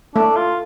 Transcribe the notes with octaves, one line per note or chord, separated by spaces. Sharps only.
A3 D4
F4